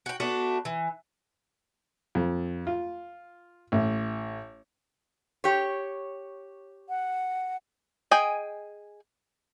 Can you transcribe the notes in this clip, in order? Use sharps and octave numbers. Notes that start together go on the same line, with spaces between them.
F#4 G5
A3 B3 D4 F#4
E3
F2
F4
A1
G4 C#5
F#5
G#4 D#5 G5 G#5